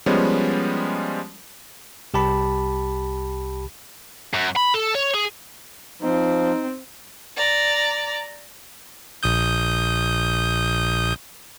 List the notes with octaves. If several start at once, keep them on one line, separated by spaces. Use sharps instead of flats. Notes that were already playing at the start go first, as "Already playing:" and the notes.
F3 G3 G#3 B3 C#4
C2 G4 A5 B5
F#2
B5
A4
C#5
G#4
F3 C4 D#4
D5 A#5
A#1 D#6 G6